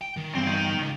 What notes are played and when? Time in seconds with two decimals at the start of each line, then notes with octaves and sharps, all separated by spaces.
0.01 G5
0.17 D#3
0.35 E2 G2 C4
0.46 D#4 G5
0.78 C#2